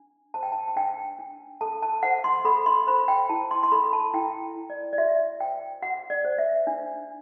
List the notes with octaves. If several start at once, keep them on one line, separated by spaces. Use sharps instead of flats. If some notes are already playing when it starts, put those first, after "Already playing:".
Already playing: D4
C5 A5
G5
A5
A5
D4 G5
D4
A4 A5
A5
C5 F#5
C6
A4 B5
C6
C5 B5
G5
E4 A5
C6
C6
A4 B5
A5
E4 G5
E4
D5
D5
F#4 E5
C5 G5
F#4 F#5
D5
C5
E5
D4